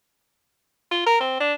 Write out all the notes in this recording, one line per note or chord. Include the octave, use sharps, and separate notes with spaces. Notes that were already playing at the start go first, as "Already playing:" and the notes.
F4
A#4
C4
D4